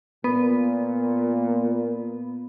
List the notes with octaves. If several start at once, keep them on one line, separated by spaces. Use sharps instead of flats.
A#2 B3